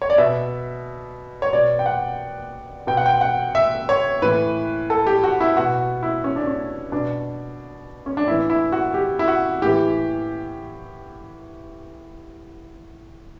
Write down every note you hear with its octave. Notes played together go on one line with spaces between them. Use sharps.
C#5
D5
B2 E5
C#5
B2 D5
G5
F#5
B2 G5
F#5
G5
F#5
E5
C#5
A2 E3 B4
A4
G4
F#4
E4
B2 F#4
E4
C#4
D4
C#4
B2 D4
C#4
D4
A2 E3 E4
E4
F#4
G4
E4
F#4
A2 E3 G4